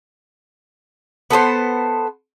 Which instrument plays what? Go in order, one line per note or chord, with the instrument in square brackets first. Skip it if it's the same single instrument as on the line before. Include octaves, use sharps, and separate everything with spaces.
[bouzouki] B3 A4 B4 C5